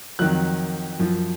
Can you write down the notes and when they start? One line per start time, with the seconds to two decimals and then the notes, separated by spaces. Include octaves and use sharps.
0.19 F2 D#3 F#3 F#6
0.99 F#2 F3